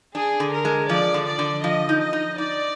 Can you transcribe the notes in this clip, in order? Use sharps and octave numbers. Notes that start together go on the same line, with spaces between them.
D4 G#4
D3
A#4
G#3
F3 D5
D3
D5
D3
F3 D#5
D#4
D#5
D#4
D#4 D5